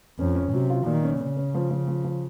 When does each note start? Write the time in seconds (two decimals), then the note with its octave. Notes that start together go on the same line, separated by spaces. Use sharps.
0.19 F2 C#4
0.35 C#4
0.53 C3 F#3
0.70 F4
0.86 A#2 D#3
1.03 C#4
1.20 C#3 C#4
1.37 C#4
1.54 F3
1.70 F3
1.88 F3
2.04 F3